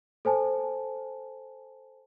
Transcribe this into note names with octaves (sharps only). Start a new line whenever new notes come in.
A4 C5 G#5 A5